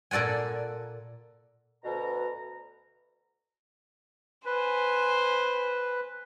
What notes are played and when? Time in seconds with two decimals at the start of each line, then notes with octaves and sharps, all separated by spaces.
0.11 A#2 A4 D5 F#5 G#5
1.84 D2 B2 A#5
4.46 B4 C5 G#5